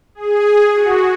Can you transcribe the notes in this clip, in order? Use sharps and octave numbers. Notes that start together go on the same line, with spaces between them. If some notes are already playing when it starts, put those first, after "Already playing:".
G#4
F#4